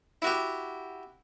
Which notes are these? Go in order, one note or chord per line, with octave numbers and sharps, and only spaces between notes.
E4 F#4 G4